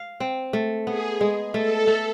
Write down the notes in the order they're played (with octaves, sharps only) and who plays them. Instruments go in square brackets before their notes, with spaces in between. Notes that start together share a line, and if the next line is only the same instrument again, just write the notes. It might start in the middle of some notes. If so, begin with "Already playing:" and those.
Already playing: [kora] F5
C4
A3
[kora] B3 [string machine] G#4
[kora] G#3
[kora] A3 [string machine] A4
[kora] A3